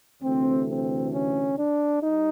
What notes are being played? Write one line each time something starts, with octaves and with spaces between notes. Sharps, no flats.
D2 C3 E3 A3 C4
C4
C#4
D4
G3 D#4